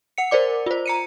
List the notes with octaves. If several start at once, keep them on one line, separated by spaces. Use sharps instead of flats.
F#5 C#7
A#4 C5 D5 D6
F4 C5
A#5 C#7 D#7